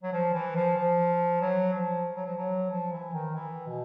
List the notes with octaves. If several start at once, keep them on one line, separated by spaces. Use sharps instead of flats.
F#3
F3
E3
F3
F3
F#3
F3
F#3
F3
F#3
F3
E3
D#3
E3
B2